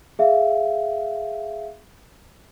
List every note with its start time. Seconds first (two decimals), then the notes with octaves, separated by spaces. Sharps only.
0.19 G#4 E5 F5